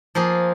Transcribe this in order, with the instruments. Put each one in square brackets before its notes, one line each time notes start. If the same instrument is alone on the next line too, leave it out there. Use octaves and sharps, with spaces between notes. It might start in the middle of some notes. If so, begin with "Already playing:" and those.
[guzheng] F3 A#3 F4 G#4